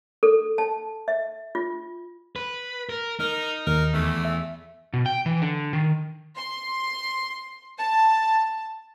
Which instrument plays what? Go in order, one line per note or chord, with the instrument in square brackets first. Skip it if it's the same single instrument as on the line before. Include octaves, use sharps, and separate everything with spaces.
[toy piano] A4
A5
E5
F4
[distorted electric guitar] B4
A#4
[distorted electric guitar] D#4 [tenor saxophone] A#4
[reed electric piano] D#2 [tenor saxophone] A#4
[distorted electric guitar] E2 [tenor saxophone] A3
[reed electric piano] E5
[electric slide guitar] B2
G5
E3
D3
D#3
[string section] C6
A5